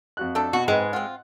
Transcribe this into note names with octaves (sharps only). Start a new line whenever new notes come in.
F2 F#4 F#6
A3 D4 A4
B2 F#4
G#2 G#3 C4 B4
C4 F4 F#5